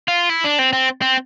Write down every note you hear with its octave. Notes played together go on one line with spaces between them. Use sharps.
F4
E4
D4
C4
C4
C4